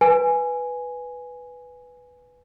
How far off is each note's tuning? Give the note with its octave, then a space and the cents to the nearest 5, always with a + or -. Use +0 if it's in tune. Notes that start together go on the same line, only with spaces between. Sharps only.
B4 +0 G#5 +0